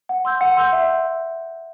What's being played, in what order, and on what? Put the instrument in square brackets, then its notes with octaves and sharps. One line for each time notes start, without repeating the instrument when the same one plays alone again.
[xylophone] F#5
C6 E6 G6
F#5
C6 E6 G6
E5